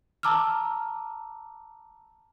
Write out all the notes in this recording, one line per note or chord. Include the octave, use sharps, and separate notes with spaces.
A5 A#5 D6 E6 F6